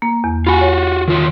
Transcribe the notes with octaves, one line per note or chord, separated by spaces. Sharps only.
A#3
E2
F4 F#4 G#5 B5
C#5
D#3 F4 C#5